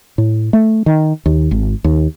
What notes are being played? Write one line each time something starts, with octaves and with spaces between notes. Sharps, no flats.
A2
A3
D#3
D#2
G#1
D#2